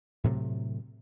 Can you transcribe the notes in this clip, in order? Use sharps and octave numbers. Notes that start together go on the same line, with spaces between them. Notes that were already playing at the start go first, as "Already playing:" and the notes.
A2 C3 F#3 A3